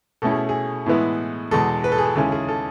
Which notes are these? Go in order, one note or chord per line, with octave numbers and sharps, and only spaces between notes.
B2 A3 C#4 E4 A4
G#4
G#4
A2 E3 G#3 B3 E4
E2 B2 G#3 A4
B4
A4
G#4
A4
D#2 C#3 G#3 C#4 E4 A4
G#4
A4